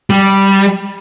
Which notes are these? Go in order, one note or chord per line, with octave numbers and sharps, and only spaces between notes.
G3